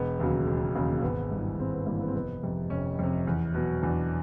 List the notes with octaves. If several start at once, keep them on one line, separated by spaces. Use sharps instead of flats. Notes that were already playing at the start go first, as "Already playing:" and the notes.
Already playing: E1 B3
D#2 C#3 F#3
E1
D#2 C#3 F#3
A#3
G#1 B3
G2 E3
G#1 C4
B3
G2 E3 A#3
B3
C4
F1 B3
F2 C3
F1 C#4
F2 C3
E2
B2 F#3
E2 D4